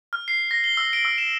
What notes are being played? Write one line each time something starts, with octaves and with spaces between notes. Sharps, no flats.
F6
C7
A#6
G7
E6
D7
E6
E7